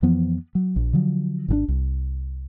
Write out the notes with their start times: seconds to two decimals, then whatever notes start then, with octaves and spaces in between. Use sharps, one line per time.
0.02 F2 E3 F3 B3
0.55 F#3
0.76 A#1
0.93 D3 F3 F#3
1.48 G#1 D#3 D4
1.68 C2